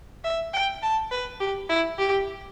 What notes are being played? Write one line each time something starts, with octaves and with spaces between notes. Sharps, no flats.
E5
G5
A5
B4
G4
E4
G4